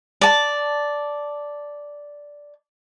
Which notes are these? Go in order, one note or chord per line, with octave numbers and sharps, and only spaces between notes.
D5 A5